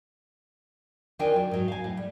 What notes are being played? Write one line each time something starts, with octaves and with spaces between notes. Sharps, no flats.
D#3 D4 F4 A#4 G5 G#5
F#3 D5
G#2 F#3
F5 G#5
A2
G3